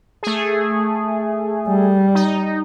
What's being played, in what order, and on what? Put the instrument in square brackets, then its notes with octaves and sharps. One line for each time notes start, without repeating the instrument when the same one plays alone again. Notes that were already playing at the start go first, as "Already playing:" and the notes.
[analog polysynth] A3 G#4
[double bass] G3
[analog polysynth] D#4